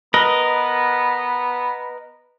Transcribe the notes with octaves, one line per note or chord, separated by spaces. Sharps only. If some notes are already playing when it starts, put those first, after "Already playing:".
B3 A#4 B4 D#5